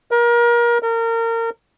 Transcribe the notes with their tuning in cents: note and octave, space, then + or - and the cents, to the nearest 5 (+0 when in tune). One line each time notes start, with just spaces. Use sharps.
A#4 +30
A#4 -30